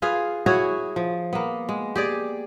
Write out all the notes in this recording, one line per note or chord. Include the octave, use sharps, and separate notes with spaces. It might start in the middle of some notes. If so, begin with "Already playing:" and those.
F4 G#4 B4 F5
E4 F#4 G#4 C#5
F3
A#3 B3
G#3
G4 G#4 D5